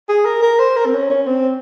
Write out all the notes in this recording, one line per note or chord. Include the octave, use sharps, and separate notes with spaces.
G#4
A#4
A#4
C5
A#4
C4
C#4
C#4
C4